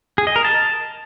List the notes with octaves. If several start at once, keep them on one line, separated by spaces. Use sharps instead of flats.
G#4
D#5
A#4
A5